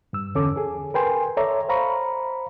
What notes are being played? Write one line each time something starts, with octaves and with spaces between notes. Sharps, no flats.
G2 E6
E2 D3 C#4 A4 D6
G#4 A4
A#4 B4 G5 G#5 C6
A4 C#5 D5 E5 A#5
C5 F5 A#5 B5 C#6